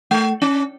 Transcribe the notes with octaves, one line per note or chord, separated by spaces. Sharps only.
A3
C#4